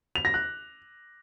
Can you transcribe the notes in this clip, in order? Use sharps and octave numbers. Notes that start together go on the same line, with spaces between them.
F7
A#6
F#6